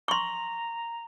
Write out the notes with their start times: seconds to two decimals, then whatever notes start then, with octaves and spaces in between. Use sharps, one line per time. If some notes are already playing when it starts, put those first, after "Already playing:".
0.08 A#5 C6 C#6